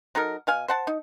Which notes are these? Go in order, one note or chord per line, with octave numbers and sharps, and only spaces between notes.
F#3 D#4 A4 A#4
B2 F5 G#5
C5 F#5 A5
D#4